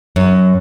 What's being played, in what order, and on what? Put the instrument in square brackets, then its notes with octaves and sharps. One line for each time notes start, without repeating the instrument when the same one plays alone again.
[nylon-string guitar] F#2